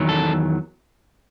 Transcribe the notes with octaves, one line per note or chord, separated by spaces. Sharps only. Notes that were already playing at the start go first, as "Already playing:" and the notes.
Already playing: E2 D#3 F#3
A4